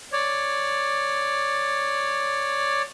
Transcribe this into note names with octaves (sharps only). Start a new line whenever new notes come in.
C#5 D5